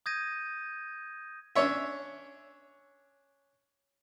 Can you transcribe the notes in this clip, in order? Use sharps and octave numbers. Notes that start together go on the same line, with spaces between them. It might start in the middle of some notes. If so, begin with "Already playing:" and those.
D#6 G6 G#6 A#6 D#7
C#4 D4 C#5 E5